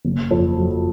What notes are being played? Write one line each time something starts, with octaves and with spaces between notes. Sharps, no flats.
F#1
F2
F#3